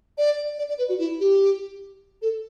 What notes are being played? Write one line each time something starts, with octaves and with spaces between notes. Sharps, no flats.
D5
D5
D5
B4
F#4
E4
G4
A4